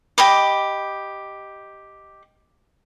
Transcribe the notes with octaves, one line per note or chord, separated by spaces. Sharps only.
G4 D#5 B5 D6